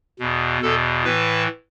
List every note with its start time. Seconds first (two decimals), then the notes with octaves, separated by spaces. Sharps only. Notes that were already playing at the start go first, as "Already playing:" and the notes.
0.19 E2 B2
0.62 E2 B2 A4
1.04 A2 E3 B4